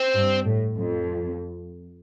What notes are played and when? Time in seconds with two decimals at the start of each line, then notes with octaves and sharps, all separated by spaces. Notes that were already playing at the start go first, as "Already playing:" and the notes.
Already playing: C4
0.14 G2
0.46 A2
0.76 F2